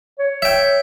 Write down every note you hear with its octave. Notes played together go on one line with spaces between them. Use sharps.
C#5
E5 G5